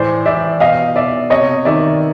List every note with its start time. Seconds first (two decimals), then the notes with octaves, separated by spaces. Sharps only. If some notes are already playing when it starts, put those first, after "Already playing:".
Already playing: A2 E3 C5 D5
0.26 E3 D5 E5
0.60 B2 D#5 F5
0.96 B2 D5 E5
1.30 C3 C#5 D#5
1.65 D#3 D5 E5